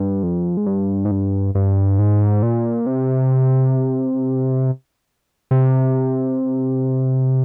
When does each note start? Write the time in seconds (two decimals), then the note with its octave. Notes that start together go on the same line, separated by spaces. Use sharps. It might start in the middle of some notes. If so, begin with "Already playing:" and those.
Already playing: G2
0.23 F2
0.57 G#2
0.66 G2
1.05 G#2
1.11 G2
1.55 G2
1.99 G#2
2.43 A#2
2.86 C3
5.51 C3